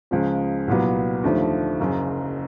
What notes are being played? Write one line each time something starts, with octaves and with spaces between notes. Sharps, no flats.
C#2 C#3 F3 G#3
C2 A#2 F#3 B3
D#2 D3 F3 A3
F#1 F#2 C#3